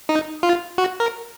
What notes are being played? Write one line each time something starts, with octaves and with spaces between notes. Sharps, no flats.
D#4
F4
F#4
A#4